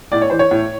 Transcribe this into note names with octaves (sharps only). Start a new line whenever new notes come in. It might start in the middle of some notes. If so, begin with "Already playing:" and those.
A2 D5
C#5
E3 C5
C#5
A2